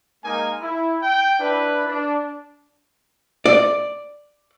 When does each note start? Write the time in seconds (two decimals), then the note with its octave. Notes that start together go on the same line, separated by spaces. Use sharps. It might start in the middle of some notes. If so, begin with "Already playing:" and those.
0.24 G#3 A#3 D#4 A#4 F5 G#5
0.61 E4
1.02 G5
1.39 D4 E4 B4
1.88 D4
3.46 D5